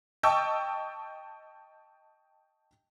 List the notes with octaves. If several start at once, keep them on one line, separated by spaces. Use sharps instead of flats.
D#5 G5 A5 C#6 E6